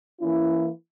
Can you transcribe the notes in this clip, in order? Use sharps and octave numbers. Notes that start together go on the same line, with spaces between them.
E3 A#3 C#4 E4